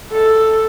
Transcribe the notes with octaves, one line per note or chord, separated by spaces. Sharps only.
A4